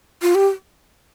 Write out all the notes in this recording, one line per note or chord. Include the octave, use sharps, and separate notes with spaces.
F4
G4